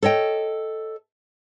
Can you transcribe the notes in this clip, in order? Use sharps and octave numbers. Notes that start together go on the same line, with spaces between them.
A4 C#5 D#5 G5